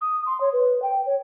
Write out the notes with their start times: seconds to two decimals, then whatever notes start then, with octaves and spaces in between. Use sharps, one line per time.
0.01 D#6
0.26 C6
0.41 C#5
0.53 B4
0.82 G5
1.06 C#5